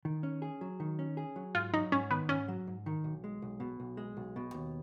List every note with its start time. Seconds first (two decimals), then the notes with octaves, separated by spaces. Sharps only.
0.05 D#3
0.23 C#4
0.42 G#4
0.61 F#3
0.80 D#3
0.99 C#4
1.17 G#4
1.36 F#3
1.55 G#2 F4
1.73 F#3 D#4
1.92 G#2 C#4
2.10 D#3 B3
2.29 G#2 C#4
2.48 F#3
2.67 G#2
2.86 D#3
3.04 B1
3.24 G#3
3.42 B1
3.60 B2
3.80 B1
3.97 G#3
4.17 B1
4.36 B2
4.54 D#2